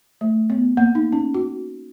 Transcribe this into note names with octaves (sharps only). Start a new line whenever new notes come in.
A3
B3
A#3
D#4
C#4
F#4